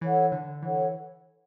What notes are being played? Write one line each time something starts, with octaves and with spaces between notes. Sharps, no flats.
E3 A4 C#5 F#5
D3
E3 A4 C#5 F#5